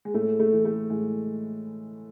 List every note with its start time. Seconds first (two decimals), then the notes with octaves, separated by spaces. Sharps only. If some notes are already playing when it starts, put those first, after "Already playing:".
0.05 G#3
0.14 A2 A3
0.39 A3
0.53 E3
0.65 A3
0.90 A2 G#3